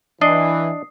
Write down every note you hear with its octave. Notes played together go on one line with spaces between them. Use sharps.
E3 D4 D#5 D#6 C7